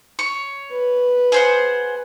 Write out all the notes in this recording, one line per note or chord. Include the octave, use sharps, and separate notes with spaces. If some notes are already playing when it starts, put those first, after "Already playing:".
C#5
B4
G#4 C5 F#5